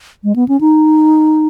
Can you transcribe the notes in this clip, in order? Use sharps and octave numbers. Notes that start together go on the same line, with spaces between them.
G#3
B3
C#4
D#4